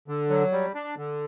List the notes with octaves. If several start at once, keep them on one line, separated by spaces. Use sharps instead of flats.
D3
F#3
G3
D4
D3